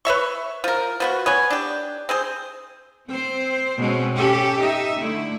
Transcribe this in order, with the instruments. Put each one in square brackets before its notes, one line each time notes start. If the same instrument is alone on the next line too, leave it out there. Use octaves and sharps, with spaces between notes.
[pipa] B4 C#5 E5 C#6
F3 A#4
F3 B3 F#4
B3 C#5 G#5
D4 G4
C4 G#4 C5
[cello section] C4 C5
B2 G#3 C4 C#4
C#4 G4 A4
D#4 E5
D3 A3 E4